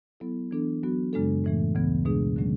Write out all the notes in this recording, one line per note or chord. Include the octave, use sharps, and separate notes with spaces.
F#3 B3 E4 A4
E3 B3 D4 A4
F#3 B3 F#4
F#2 C#3 G#3 D4 A4
A2 E3 A3
D2 C#3 E3 B3
B2 G#3 D4 G#4
D3 F#3 A3 C#4